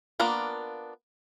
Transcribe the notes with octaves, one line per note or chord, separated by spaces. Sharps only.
A#3 B3 D4 F4 A#4